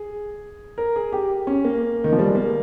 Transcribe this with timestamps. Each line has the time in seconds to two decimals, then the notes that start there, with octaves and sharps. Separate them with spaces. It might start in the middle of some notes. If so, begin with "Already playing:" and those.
Already playing: G#4
0.78 A#4
0.96 G#4
1.12 G4
1.47 C#4
1.65 A#3
2.04 D#3
2.13 F3
2.19 G3
2.27 G#3
2.35 A#3